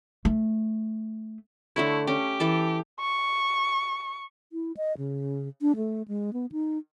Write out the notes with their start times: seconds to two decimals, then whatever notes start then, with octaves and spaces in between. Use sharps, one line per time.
0.25 A3
1.76 D3 A3 E4 C#5
2.07 C#4 G4
2.40 E3 A4 A5
3.01 C#6
4.53 E4
4.77 D#5
4.98 C#3
5.61 D4
5.76 A3
6.08 G#3
6.33 B3
6.52 D#4